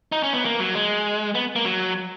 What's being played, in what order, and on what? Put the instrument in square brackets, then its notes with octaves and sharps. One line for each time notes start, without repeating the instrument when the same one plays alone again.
[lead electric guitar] D#4
C#4
B3
A#3
F#3
G#3
B3
A#3
F#3